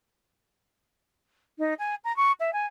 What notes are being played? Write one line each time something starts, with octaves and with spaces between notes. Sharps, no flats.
D#4
G#5
A#5
C#6
E5
G#5